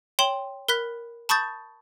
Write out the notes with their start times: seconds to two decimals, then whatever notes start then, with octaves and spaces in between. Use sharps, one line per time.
0.19 C#5 G5 C6 E7 F#7 G7
0.68 A#4 B5 F#6 B6
1.29 A5 B5 C#6 D#6 G6 A6